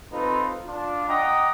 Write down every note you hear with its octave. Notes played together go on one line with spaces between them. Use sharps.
C4 D#4 F4 A4 B4
D4 F4
D#5 F#5 G5 A#5 D6 D#6